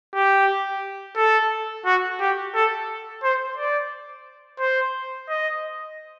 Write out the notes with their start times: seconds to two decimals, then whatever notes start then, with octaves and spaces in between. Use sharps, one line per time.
0.15 G4
1.17 A4
1.85 F#4
2.20 G4
2.55 A4
3.23 C5
3.57 D5
4.60 C5
5.29 D#5